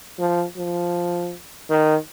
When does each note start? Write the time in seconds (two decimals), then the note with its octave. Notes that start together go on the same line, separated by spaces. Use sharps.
0.19 F3
0.57 F3
1.70 D#3